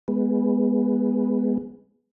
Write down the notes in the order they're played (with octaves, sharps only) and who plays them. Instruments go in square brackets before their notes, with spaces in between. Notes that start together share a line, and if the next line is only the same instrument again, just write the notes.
[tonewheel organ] G#3 B3